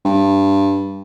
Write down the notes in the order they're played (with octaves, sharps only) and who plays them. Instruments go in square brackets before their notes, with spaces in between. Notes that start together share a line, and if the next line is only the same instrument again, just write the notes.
[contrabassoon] G2